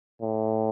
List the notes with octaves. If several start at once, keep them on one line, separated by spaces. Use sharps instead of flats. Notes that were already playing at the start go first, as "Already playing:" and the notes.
A2